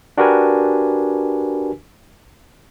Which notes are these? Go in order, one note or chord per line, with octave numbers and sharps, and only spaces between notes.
D4 F#4 G4 A#4 B4 G#5